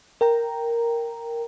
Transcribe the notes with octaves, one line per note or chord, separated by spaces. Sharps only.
A#4 G5 A#5